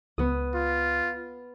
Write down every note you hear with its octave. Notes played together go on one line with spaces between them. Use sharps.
C#2 B3 D#6
F4